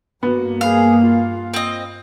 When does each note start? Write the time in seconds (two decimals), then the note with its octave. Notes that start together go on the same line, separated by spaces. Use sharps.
0.23 G2 A#3 B3 F#4
0.61 G#4 B4 F5
1.02 F4
1.54 C4 D#5